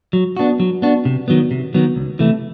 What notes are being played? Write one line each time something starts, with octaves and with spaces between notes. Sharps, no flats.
F#3
B3 D4 F#4
F#3
B3 D4 F#4
C3
D#3 F#3 B3
C3
D#3 F#3 B3
C#2
C3 E3 A3